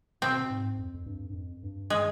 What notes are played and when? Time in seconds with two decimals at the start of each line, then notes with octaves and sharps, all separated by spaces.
0.22 B2 C4
0.44 B2
0.50 G#2
0.78 F2
0.94 F2
1.06 G2
1.30 G2
1.34 F2
1.63 G2
1.90 G#3